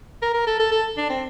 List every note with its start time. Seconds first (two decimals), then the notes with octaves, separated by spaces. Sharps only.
0.22 A#4
0.34 A#4
0.47 A4
0.59 A4
0.71 A4
0.97 D4
1.09 C4